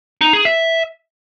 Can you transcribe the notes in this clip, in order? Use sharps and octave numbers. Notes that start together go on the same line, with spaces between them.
D#4
G#4
E5